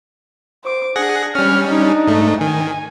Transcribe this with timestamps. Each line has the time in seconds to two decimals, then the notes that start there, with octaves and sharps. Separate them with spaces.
0.64 C5 D6
0.96 D4 G#4 F#5 A#6
1.35 G3 C#4 F6
1.68 D4 D#4
2.07 G#2 A3
2.41 D#3 G#5